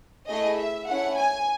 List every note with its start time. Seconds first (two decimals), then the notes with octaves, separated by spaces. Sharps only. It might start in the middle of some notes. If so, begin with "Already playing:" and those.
0.28 A3 E4 G#4 D#5
0.58 E5
0.87 A3 C#4 E4 F#5
1.17 G#5